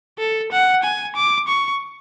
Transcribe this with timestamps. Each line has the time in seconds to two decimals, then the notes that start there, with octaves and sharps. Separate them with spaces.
0.19 A4
0.52 F#5
0.83 G#5
1.16 D6
1.48 C#6